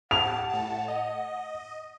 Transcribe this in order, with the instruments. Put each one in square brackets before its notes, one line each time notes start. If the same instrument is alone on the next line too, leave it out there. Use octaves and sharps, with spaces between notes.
[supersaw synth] G4 A5 [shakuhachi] F#5 [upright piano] F7
[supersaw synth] A2 A5
D#5